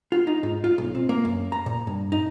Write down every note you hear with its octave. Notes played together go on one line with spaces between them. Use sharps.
F4
D#4
G#2
F4
B1
C4
A#3
F#2
A#5
A#2
G2
D#4